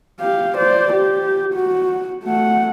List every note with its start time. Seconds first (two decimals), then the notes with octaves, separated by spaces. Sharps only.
0.20 G4 F5
0.57 C5 D5
0.92 G4
1.53 F#4
2.23 A3 F#5